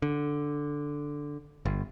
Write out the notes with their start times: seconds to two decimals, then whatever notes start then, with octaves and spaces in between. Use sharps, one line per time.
0.02 D3
1.65 G1